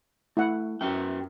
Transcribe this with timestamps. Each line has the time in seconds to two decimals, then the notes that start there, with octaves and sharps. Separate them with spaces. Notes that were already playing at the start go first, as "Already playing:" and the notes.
0.37 A3 E4 F#5
0.81 F#2 F#4 E5 G5